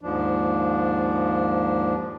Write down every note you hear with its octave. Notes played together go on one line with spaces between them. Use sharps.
D#2 G#2 F3 D4